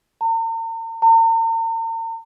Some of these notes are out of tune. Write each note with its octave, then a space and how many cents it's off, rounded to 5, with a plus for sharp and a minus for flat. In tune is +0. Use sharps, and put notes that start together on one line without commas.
A#5 -45
A#5 -45